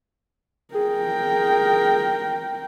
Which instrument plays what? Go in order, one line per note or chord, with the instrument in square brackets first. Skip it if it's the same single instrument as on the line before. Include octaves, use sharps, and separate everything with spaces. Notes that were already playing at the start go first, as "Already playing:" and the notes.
[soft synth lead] G#4 [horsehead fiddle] A#4 G5